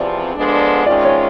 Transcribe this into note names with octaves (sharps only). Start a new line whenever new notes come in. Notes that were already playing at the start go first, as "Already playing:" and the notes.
Already playing: E2 C3 F3 D5
D3 F3 G#3 B3 D4
C3 D#3 G#3 C#4 F4 D5
C#5